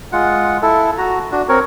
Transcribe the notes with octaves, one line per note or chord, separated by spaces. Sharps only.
G#3 F4 F#5
E4 A4
F#4 A#5
D4 F#4
C4 A#4 C#5